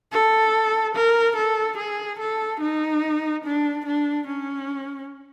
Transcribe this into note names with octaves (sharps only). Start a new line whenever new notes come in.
A4
A#4
A4
G#4
A4
D#4
D4
D4
C#4